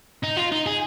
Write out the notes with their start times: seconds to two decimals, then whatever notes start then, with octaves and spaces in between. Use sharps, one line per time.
0.23 D#4
0.36 F4
0.52 D#4
0.66 G#4